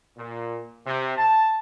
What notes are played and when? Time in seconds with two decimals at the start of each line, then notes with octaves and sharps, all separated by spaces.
0.17 A#2
0.85 C3
1.18 A5